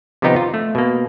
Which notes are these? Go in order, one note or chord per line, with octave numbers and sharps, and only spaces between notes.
C3 D#3 F3 B3 D#4 G4
F4
A3
B2 A#3